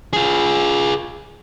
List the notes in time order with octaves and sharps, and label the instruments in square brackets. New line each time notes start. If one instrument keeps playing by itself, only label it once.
[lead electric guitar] F4 G#4